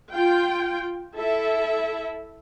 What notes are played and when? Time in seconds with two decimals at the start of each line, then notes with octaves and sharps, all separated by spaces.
0.14 F4 G5
1.16 E4 A4 E5